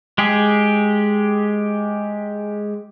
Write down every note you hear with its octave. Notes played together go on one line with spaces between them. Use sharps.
G#3 G4 G#4